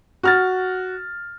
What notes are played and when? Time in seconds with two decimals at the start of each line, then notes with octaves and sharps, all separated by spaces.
0.23 F#4 F6 A6